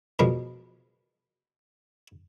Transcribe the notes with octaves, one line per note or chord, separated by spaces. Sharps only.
B2 F3 G3 G#3 A#4